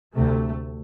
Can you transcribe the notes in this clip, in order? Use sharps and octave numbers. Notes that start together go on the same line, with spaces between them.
D2 C3 A3